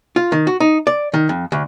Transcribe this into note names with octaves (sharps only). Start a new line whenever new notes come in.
F4
D#3
F#4
D#4
D5
D#3
F2
D2